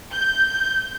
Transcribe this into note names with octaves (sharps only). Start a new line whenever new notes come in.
G6